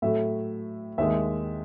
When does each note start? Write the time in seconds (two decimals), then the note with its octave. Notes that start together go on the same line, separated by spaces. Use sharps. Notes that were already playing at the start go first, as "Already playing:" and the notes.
0.02 A2 F#3 A3 E5
0.98 D#2 D#3 G#3 E5